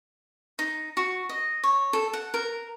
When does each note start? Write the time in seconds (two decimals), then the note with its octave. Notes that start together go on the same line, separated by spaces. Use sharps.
0.59 D#4
0.97 F#4
1.29 D#5
1.64 C#5
1.93 A4
2.13 F#5
2.34 A#4